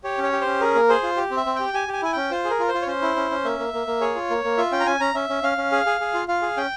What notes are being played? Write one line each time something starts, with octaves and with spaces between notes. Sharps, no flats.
G4 C#5
C#4
C#5
G4
C#4 C5
G#4 A#4
A#3
G#4 C5
F4
G4
C4
E5
C4
G4 G5
G4 G#5
G4 G#5
E4 G#5
C#4 G5
F4 C5
G#4
A#4
F4
C5
F4
C#5
C#4 C5
E4
C#4
C#4
A#3 E5
A#3
A#3
A#3
G#4 C#5
F4
A#3
A#3
F4 E5
C#4 G5
A#5
C#4 G#5
C#4 A#5
C#4 E5
C#4
C#4 F5
C#4
G#4
G#4
G#4
F4
F4 F5
G#4
C#4 G5